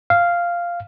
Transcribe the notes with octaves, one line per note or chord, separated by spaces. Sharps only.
F5